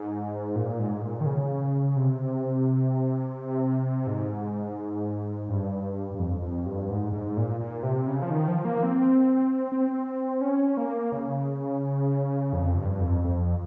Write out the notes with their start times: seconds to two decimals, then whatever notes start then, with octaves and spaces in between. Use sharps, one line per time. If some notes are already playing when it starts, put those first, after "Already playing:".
Already playing: G#2
0.55 A#2
0.79 G#2
1.02 A#2
1.21 D#3
1.26 C#3
1.96 C3
4.07 G#2
5.49 G2
6.15 G2
6.19 F2
6.42 F2
6.66 G2
6.90 G#2
7.13 G#2
7.37 A#2
7.60 A#2
7.83 C3
8.07 C#3
8.22 F3
8.31 D#3
8.48 F3
8.65 A#3
8.83 C4
9.72 C4
10.41 C#4
10.77 A#3
11.12 C#3
12.53 F2
12.77 G2
13.01 F2
13.24 F2